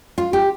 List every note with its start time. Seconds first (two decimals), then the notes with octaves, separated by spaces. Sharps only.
0.18 F4
0.33 G4